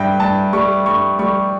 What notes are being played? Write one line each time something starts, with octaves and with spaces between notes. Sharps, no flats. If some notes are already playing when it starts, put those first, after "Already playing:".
Already playing: G2 G3 E5 G5
G2 A5
G3 C#6
G2 C#6
G3 C#6